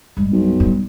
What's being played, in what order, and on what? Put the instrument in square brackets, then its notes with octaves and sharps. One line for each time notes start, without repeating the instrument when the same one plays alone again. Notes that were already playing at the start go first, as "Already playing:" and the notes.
[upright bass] G2 G#3
[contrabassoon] B1
[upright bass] G2 G3